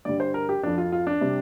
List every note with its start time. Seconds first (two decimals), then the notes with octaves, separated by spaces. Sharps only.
0.05 G2 D3 G3 D5
0.20 C5
0.34 A#4
0.49 G4
0.63 F2 F3 D4
0.78 F4
0.92 F4
1.07 D4
1.21 C3 G3